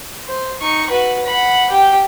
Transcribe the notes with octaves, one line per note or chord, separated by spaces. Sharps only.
C5
D#4 C#6
F#4 B4
F#5 B5
G4 G5